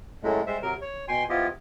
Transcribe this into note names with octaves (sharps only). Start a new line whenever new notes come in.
F#2 A2 F#3 G#3 A3
G3 G#3 C5 E5
C3 F#3 A#4
C#5
B2 G5 G#5 C6
F3 B3 E4 F4 G4 D#5